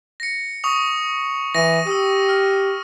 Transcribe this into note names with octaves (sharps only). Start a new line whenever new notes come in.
A#6 C#7
C#6 D#6 F7
E3 A#6 D#7
G4 D#6 E6
F6